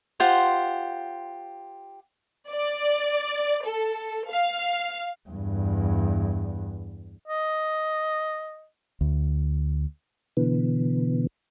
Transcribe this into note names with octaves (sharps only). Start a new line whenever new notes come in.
F4 G4 C5 F#5
D5
A4
F5
E2 G2
D#5
D2
B2 D3 E3 B3